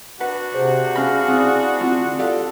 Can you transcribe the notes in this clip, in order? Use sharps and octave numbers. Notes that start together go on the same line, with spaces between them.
D4 F#4 B4 F#5
C3 G#4 C5
B2 C#4 G#4 F5 B5 F6 A#6
C4 E4 D5 D#6
D2 C4 F4
G4 A4 D5 F5